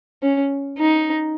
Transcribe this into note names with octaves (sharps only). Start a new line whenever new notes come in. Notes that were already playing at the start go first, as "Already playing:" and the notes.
C#4
D#4